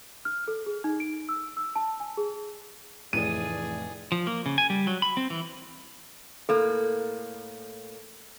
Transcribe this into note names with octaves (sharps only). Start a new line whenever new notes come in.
F6
A4
G#4
D#4
D7
E6
E6
A5
G#5
G#4
F1 A2 E3 G#4 D5 D#7
F3
A#3
C#3
G#5
G3
F#3
B5
C4
E3
A2 A#3 A4